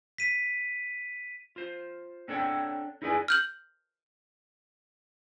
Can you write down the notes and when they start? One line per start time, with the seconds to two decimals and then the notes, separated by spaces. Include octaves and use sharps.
0.18 B6 D#7
1.56 F4 C5
2.28 C4 D4 A4 C#5 F#5 G5
3.02 D#4 E4 G#4 B4 D5 G#5
3.28 F6 G6 F#7